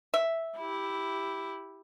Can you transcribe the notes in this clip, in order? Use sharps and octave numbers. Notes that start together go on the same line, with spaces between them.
E5
E4 G4